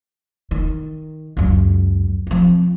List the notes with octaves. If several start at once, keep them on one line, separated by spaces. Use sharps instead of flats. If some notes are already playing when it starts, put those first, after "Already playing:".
D#3
C#2 F#2
F3 C4